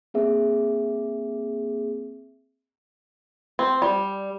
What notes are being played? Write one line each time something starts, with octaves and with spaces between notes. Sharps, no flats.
A#3 C4 G#4 E5
C4
G3